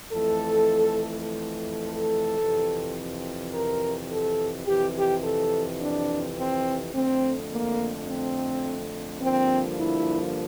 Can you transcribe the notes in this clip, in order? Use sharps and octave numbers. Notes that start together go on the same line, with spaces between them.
F2 E3 A3 A4
A4
F2 C3 E3
A#4
A4
F2 C3 E3 G4
G4
A4
D4
C4
F2 D3 A3 C4
A#3
C4
G2 D3 F3 A#3 C4
E4